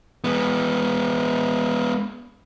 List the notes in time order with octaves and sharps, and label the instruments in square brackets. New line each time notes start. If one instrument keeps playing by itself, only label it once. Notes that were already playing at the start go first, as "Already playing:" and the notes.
[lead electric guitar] G#3 B3